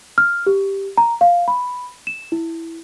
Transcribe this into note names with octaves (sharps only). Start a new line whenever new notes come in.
F6
G4
A#5
F5
B5
E7
E4